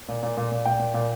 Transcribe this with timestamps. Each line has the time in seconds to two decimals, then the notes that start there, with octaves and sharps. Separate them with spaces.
0.08 A#2
0.23 A#2
0.37 A#2
0.52 A#2
0.66 A#2 G5
0.80 A#2
0.94 A#2